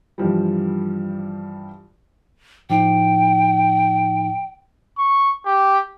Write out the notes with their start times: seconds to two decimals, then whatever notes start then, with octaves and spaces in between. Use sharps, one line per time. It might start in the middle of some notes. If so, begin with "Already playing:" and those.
0.18 G2 E3 F3 G3
2.70 A2 F3 D#4 G5
4.98 C#6
5.46 G4